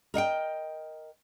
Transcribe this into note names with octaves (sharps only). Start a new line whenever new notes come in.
A#4 D#5 F#5 G5